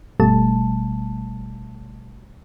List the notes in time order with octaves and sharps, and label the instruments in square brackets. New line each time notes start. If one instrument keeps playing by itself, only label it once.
[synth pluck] G1 B2 G3 A3 A5